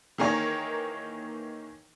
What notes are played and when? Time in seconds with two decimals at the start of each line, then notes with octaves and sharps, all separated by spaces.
0.18 D#3 E3 A#3 G#4 A#4 C#5